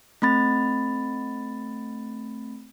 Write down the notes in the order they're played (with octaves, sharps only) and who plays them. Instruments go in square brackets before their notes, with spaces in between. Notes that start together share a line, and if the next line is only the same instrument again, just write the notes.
[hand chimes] A3 C4 B5 A6